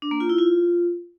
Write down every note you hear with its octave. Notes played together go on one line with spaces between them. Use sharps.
D4
A#3
F4
E4
F4